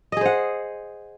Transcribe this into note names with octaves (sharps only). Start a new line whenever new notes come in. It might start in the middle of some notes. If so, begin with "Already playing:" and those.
G#4 C5 D#5 F#5